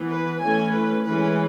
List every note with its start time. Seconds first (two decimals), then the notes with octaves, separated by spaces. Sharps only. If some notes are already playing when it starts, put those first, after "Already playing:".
Already playing: E3 B3
0.08 B4
0.41 E3 A3 C#4 G#5
0.73 B4
1.06 E3 G#3 C#4 B4